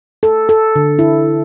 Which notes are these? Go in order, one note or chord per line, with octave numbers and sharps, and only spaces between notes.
A4
A4
D3
E4